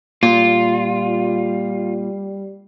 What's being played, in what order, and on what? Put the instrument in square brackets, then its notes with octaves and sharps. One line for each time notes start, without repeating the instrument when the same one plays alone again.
[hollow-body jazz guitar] A#2 [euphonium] G3 [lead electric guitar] F4